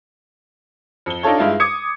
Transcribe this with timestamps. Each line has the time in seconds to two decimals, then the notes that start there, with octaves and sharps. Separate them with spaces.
1.06 F2 G7
1.23 D4 D#4 F4 A4 C#5
1.38 G2 G#3 E4 F4
1.60 D6 D#6 G#6 C#7